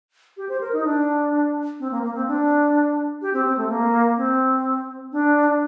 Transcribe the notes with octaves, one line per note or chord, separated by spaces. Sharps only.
G4
C5
A#4
D#4
D4
C4
A#3
A#3
C4
D4
G4
C4
C4
A3
A#3
C4
D4